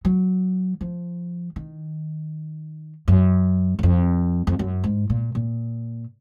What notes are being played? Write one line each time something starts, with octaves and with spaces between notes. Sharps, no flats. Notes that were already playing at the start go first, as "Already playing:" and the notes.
F#3
F3
D#3
F#2
F#2
F2
F2
F#2
G#2
A#2
A#2